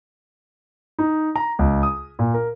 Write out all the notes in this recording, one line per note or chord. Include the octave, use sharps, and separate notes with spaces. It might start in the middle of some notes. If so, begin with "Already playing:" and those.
D#4
A#5
C#2
D#6
A#2
A#4